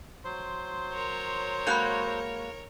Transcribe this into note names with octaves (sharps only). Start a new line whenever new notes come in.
F#3 C5 C6
A#4 C#5
G#3 A#3 F#4 B5 F#6 G6